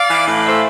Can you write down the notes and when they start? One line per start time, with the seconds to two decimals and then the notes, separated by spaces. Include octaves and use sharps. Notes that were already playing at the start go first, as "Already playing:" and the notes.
Already playing: D5 F5
0.10 E3
0.28 A2
0.45 A3 C5 E5